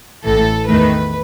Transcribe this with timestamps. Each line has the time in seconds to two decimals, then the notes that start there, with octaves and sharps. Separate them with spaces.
0.23 A1 A2 E3 A4
0.68 E2 D#3 A3 B4